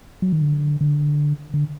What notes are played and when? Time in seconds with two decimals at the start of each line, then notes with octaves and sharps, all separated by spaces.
0.22 F#3
0.33 D#3
0.42 D3
0.81 D3
1.54 D3